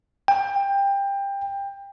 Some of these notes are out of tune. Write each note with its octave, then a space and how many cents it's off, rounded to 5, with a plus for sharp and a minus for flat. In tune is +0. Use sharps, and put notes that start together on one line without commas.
G5 +20